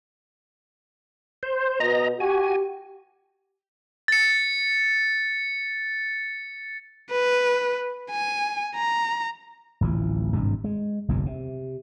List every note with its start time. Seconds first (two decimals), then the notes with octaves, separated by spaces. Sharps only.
1.43 C5
1.80 B2 D#5 A#5
2.20 F#4 G4 G#5
4.08 A6 C#7
7.11 B4
8.10 G#5
8.75 A#5
9.81 D1 A1 E3 F3
10.35 G#1 G2 C3
10.64 G#3
11.08 F#1 B1 E2 G#2
11.26 C3